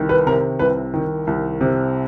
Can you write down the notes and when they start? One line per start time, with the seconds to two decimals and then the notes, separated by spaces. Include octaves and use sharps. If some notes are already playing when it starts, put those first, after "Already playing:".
Already playing: C2 D#3
0.09 B4
0.26 C3 A#4
0.59 C2 B4
0.94 D#3
1.27 C2
1.61 C3